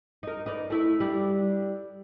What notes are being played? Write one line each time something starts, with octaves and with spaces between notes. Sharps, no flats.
D#4 A#4
D#4 B4 D5
A3 E4
G3 D4